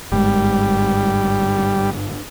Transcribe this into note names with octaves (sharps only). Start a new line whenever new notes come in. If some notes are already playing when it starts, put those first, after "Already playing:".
G1 G#2 G3 G#3